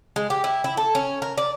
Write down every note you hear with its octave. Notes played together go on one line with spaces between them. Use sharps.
G#3
G4
E4
E4
A4
C#4
A#4
D5